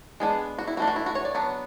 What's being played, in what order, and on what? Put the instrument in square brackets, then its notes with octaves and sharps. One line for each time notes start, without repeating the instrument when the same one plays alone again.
[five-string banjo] G#3 B3 D4 G#4
F#4
E4
E3 A3 D4 F#4
F#4
E4
F#4
C#5
D5
F#3 B3 D4